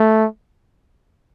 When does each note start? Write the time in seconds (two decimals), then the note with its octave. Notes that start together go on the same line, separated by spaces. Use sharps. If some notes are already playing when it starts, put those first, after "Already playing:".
Already playing: A3